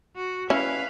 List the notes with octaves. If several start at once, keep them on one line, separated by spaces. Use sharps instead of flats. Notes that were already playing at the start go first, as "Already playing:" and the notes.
F#4
C#4 E4 B4 F5